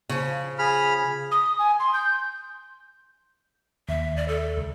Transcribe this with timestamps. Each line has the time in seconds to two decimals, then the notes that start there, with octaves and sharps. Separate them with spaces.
0.09 C#3 F3
0.59 G#4 B5 F6
1.31 D#6
1.58 G#5
1.79 C6
1.93 G6
3.89 D#2 E5
4.17 D5
4.28 A4
4.57 C#2